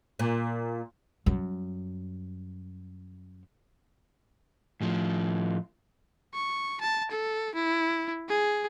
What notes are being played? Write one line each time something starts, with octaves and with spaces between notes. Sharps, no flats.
A#2
F#2 G3
A2 F3
C#6
A5
A4
E4
G#4